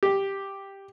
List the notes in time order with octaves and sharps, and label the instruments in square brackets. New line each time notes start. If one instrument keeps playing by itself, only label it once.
[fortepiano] G4